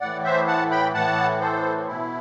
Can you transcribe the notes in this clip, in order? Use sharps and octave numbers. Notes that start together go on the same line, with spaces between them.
A2 E3 D5 F#5
C5 E5
F#5 A5
G5 B5
A2 E3 F#5 A5
A4 C5
B2 E4